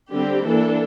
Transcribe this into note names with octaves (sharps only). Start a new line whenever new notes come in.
D3 G3 C4 G4
E3 A#3 D4 A4